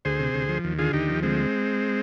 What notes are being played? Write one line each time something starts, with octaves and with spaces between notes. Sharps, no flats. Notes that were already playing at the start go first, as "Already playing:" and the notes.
D2 G#4 C5
C3
D2
F3
D#2
D3 F4 G#4
D#2 D#4 G4
F3
D2 G#3 C4